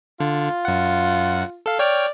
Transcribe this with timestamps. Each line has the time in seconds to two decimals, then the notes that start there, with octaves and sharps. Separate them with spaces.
0.20 D3 F4
0.65 F#2 F#5
1.66 A4 F5
1.79 C#5 D5 G5 F6